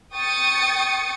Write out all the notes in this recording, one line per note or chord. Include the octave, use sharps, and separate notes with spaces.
G5 C#6 D#6 A6 C#7